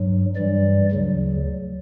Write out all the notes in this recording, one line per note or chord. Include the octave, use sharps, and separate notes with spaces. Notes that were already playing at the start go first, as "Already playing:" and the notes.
Already playing: G2 F#3
G2 E3 G3 D5
D2 C#3 F#3